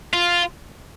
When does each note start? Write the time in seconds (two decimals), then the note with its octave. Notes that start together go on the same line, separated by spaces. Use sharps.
0.13 F4